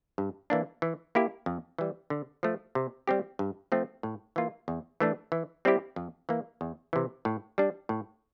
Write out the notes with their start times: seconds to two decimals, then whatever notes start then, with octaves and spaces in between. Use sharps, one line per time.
0.18 G2
0.50 E3 A#3 D4
0.82 E3
1.15 A#3 E4 G4
1.46 F2
1.79 E3 G3
2.10 D3
2.43 F3 A3
2.75 C3
3.08 G3 C4 G4
3.39 G2
3.72 F3 A3 C4
4.03 A2
4.36 E3 A#3 F4
4.68 E2
5.00 E3 A3 D4
5.32 E3
5.65 G3 C4 E4 G4
5.96 F2
6.29 E3 A#3
6.61 E2
6.93 C3 E3
7.25 A2
7.58 G3 D4
7.89 A2